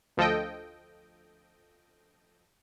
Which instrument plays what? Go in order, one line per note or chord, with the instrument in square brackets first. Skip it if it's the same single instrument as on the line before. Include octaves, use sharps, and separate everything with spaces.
[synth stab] D2 F3 A4 D#5 G5